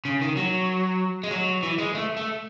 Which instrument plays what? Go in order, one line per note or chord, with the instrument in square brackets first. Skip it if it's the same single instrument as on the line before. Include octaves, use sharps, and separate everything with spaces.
[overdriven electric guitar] C#3
D#3
F#3
G#3
F#3
E3
G#3
A3
A3